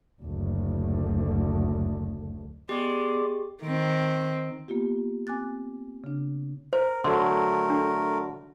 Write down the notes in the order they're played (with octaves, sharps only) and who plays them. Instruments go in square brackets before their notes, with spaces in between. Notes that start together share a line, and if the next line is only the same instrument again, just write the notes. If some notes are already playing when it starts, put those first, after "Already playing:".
[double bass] F#1 D2
[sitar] G#3 [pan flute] B3 [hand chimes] G4 [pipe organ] D5 C6 D6
[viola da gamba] D#3 C4
[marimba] A#3 B3 F4 G4
C4 G#5 D6 F#6 A6
C#3 D4
[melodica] A#4 [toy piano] C5
[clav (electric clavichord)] D3 F#3 [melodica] A3 A#4 [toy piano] C6
[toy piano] D4